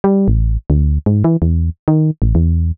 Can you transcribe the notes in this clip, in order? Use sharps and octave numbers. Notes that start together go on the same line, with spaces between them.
G3
A1
D2
G#2
E3
E2
D#3
A1
E2